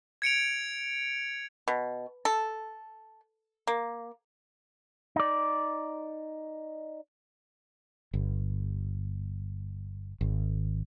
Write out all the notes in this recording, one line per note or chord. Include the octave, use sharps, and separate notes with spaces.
G#6 C#7 D7 F7
B2
A4
A#3
D#4 D5
G1
G#1